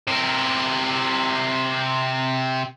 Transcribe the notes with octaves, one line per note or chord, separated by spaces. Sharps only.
C3 A#4